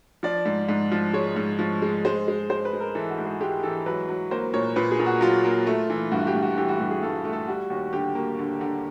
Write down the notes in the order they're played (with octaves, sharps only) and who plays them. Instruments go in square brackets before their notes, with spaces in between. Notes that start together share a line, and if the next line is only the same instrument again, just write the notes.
[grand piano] F3 D5
G#2
G#2
F3
G#3 C#5
G#2
F3
G#3
G#3 C5
G#3
G#3 C5
B4
G#3
A#4
E3 A4
F#4
G#2
G#4
G#3 G4
E3 A4
F#3 B4
F#3
A#3 C5
A#2 C#5
A#2 B4
G#4
A#2
F#4
F#3 F4
A#3
A3
E3
G2 F#4
G4
G2
F#4
E3 G4
F#4
G2 G4
G#4
G2 A4
A3
A4
G3 F#4
D#2 F#4
D3 G4
A#3
D3
D3